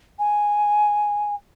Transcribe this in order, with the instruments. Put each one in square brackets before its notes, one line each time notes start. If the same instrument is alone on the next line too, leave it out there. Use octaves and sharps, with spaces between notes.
[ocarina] G#5